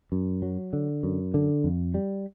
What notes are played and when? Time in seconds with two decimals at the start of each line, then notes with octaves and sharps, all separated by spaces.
0.12 F#2
0.42 F#3
0.73 D3
1.03 F#2
1.34 D3
1.64 F2
1.94 G3